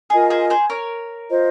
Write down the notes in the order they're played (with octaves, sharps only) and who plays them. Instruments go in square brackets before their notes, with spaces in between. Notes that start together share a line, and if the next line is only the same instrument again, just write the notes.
[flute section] F4 A#4 D#5 G#5 [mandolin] G#4
[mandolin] G#4 C5
G#4 C5
A#4 C#5
[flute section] F4 C5 D#5